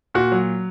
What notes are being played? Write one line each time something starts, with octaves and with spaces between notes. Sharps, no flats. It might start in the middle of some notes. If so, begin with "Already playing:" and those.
A#2 F#4
F#3